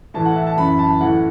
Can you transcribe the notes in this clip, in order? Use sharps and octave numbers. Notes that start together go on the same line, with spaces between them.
A2 E3 A5
F#5
E5
A5
F#2 E3 B5
A5
A2 E3 F#5